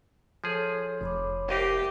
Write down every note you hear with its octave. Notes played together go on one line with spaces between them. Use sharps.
F3 G#4 A4 C#5
F1 C#5 B5 D6
C2 G4 A#4 D#5 F5